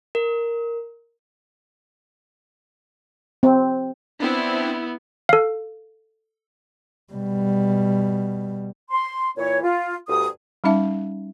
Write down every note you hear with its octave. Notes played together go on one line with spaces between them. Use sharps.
A#4
C4
B3 C4 D4 E4
A4 F5
B2 G3
C6
A#2 E3 C#5
F4
D2 G2 D#6
G3 C#4 D#4 E5 A5